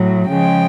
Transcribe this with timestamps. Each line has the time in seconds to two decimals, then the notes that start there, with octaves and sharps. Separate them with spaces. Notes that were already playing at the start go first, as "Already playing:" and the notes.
Already playing: A2 F#3
0.29 C#3 F3 G#3 G5